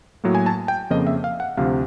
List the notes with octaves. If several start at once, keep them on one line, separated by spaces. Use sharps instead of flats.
A2 F#3 A#3
G#5
A5
G5
F2 C#3 F3 A#3 D#5
E5
F5
F#5
D2 C3 F3 F5